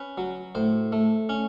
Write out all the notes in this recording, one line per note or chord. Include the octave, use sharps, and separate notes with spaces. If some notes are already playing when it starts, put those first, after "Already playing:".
Already playing: C#4 B4
F#3
A2 C5
A3
C#4